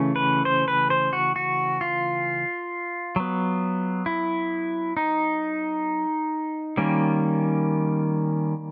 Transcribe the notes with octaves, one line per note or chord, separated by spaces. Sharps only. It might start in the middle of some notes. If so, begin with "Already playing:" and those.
Already playing: C#3 E3 A3 C#4
B4
C5
B4
C5
F#4
F#4
F4
F#3 B3
E4
D#4
D#3 G3 A#3 C#4